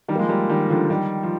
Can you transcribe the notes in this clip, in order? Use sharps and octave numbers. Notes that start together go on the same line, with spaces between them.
D#3 G3
A#3
F3 G#3
G3 A#3
D#3 G3
D3 F3
D#3 G3
F3